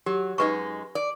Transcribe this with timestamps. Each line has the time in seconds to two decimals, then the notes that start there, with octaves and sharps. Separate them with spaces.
0.06 F#3 G4
0.38 F#2 G#3 D#4 B4 C#6
0.95 D5